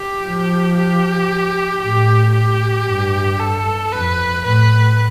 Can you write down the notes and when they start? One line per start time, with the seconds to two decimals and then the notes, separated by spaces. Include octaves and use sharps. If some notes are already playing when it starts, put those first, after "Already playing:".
Already playing: G4
0.25 F3
0.77 G4
1.81 A2 G4
2.35 G4
2.87 G2
3.39 A4
3.92 F2 B4
4.44 A2 B4